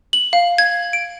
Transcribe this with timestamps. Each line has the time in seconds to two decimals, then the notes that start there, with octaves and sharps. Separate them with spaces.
0.13 F#7
0.33 F5
0.58 G#6
0.93 D7